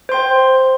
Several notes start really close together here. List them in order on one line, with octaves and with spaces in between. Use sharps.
C5 C6 G5